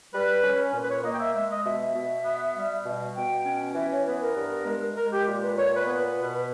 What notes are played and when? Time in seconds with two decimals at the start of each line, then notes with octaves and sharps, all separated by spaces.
0.13 G3 B4
0.44 C#4
0.74 A#2
0.83 B4
0.89 C#5
1.04 A#3 D#5
1.12 G5
1.20 E5
1.34 G#3 E5
1.50 D#5
1.65 B2 E5
1.80 E5
1.95 B2
2.25 B3
2.55 G3
2.85 B2
3.15 B2 G5
3.46 C#4
3.75 E3 E5
3.91 C#5
4.06 B3 B4
4.21 A#4
4.36 G2
4.66 G#3
4.96 G#3 A#4
5.12 G4
5.27 A#2
5.42 B4
5.57 A#2 C#5
5.76 B4
5.87 B3
5.97 B4
6.18 B2 B4
6.32 B4